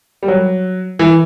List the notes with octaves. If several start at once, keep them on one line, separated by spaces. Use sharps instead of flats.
G3
F#3
E3